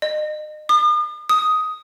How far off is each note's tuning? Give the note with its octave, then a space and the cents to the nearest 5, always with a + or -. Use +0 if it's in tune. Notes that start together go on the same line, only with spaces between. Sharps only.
D#5 -35
D#6 -45
D#6 +5